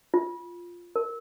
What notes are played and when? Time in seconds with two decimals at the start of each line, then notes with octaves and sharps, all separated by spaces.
0.14 F4
0.96 A#4